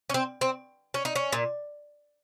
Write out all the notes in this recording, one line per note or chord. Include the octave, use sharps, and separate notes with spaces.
C#4
C4
C4
C#4
D#4
C#4
A#2